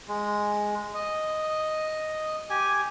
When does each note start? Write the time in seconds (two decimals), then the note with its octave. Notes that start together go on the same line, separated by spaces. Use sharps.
0.08 G#3
0.94 D#5
2.50 G4 G#5